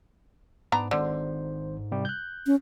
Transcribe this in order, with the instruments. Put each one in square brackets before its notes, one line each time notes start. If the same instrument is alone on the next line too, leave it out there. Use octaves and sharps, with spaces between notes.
[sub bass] G#2 [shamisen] B3 D4 A#5
[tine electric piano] G#1 C5 [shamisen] D3
[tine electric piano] C3 G3 G5
F#6 G6
[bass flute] C#4